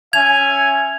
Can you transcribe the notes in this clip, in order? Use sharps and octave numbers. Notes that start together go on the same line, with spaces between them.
C#4 E5 G#5 G#6 F7